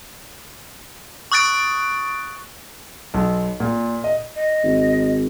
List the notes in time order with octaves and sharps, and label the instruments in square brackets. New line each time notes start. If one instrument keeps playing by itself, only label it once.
[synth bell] C#6 D#6 F#6 A6 D7
[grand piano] B1
A#2
D#5
[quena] D#5
[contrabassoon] G#1